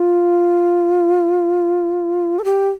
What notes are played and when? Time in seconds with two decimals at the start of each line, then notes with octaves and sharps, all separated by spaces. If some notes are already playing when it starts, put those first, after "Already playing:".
Already playing: F4
2.39 A4
2.45 G4